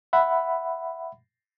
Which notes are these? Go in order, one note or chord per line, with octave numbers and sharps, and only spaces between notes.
E5 F#5 B5